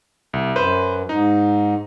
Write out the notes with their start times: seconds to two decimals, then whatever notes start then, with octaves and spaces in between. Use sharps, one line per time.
0.33 C2
0.56 F#2 B4 C5
1.09 G#2 D#4